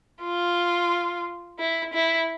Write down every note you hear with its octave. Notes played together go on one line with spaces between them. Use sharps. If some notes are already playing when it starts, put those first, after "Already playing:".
F4
E4
E4